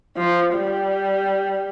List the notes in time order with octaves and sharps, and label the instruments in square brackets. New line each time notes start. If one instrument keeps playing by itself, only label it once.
[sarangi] F3
G3